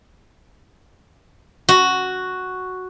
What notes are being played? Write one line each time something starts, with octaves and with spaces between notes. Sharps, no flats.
F#4